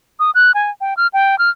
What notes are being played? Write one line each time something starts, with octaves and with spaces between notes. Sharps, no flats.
D#6
F#6
G#5
G5
F6
G5
F6